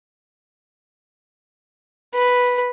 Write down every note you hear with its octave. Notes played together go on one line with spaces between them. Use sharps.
B4